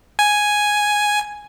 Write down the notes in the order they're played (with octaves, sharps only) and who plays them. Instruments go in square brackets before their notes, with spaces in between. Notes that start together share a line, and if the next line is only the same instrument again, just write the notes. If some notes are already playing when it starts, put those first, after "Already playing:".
[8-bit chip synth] G#5